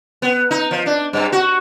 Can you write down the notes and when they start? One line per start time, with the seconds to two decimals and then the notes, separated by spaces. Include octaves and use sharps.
0.22 B3
0.51 D#4
0.71 F3
0.86 D4
1.13 G2
1.32 F#4